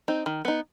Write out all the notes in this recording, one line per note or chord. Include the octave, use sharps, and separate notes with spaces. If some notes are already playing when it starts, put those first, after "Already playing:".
C4 D#4
D#3
B3 D#4